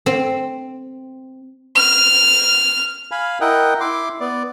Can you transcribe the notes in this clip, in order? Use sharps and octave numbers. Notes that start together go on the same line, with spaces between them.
C4
F6
F5 G#5 B5
E4 A#4 D#5 F#5 G5
E4 C6 D6
B3 D5